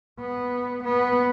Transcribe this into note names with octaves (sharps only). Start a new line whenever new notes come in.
B3
B3